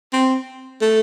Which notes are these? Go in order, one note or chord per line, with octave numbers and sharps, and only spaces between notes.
C4
A3